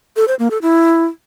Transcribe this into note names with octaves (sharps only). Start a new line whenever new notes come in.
A4
C5
A#3
A4
E4